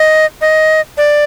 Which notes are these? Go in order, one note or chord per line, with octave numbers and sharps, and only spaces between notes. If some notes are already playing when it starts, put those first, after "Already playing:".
Already playing: D#5
D#5
D5